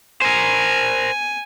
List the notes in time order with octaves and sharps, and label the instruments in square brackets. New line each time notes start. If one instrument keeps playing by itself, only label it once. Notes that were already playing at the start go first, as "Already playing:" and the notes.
[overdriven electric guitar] A#4 C5 [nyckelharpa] G#5